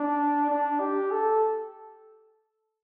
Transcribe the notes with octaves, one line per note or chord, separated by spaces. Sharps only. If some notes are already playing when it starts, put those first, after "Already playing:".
Already playing: D4
D4
G4
A4